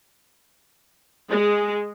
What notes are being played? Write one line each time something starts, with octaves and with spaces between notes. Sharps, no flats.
G#3